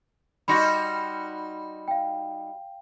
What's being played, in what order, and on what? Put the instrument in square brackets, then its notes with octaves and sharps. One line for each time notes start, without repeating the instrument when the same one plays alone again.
[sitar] G3 D#4 F#4 [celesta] B5 C6 A#6
[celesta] F5 G5